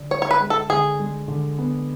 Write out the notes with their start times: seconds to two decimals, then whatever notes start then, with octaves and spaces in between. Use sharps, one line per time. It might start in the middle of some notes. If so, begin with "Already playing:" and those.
Already playing: D3 D4
0.11 D4 C#5
0.22 C#5
0.31 B4
0.40 G#3
0.50 A4
0.69 D3 G#4
1.00 G#3
1.28 D3
1.58 B3